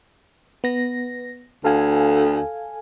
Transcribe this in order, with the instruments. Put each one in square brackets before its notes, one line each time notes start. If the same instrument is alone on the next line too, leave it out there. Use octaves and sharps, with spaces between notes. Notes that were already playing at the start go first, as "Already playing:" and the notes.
[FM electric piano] B3 A#6
[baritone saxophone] D2 [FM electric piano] A4 F5 G#5